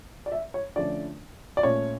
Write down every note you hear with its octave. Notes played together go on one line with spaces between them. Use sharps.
D5
E5
C#5
D3 F3 A3 C#4 D5
D5
A#2 A3 C#4 C#5